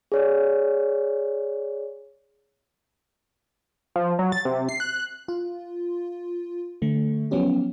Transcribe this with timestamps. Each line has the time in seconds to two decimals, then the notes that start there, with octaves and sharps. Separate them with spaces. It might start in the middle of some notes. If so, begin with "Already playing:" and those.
0.12 G#4 C#5 D5
3.96 F3
4.19 F#3
4.32 A6
4.45 C3
4.69 C7
4.80 F#6
5.28 F4
6.82 D3 A3
7.31 F3 F#3 B3 C#4 G4